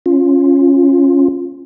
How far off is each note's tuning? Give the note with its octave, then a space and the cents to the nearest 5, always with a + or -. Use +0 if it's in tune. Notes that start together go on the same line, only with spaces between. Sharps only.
C#4 -10 F4 +0